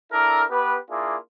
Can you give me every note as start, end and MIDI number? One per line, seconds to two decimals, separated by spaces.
0.12 0.42 62
0.12 0.42 64
0.12 0.42 69
0.12 0.42 70
0.50 0.76 59
0.50 0.76 67
0.50 0.76 71
0.89 1.16 58
0.89 1.16 62
0.89 1.16 64
0.89 1.16 65
0.89 1.16 68